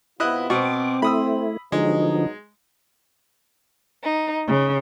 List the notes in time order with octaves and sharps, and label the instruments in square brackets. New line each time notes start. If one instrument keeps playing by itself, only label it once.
[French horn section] C3 B3 F4 [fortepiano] E4 D#5 F#6
[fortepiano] B2 C#6 [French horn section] C4 [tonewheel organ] D6
[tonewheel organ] A3 E4 [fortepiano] B5 D#6 E6
[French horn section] B2 F#3 D#4 [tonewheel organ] D3 F3 [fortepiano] G#3
[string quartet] D#4
C#3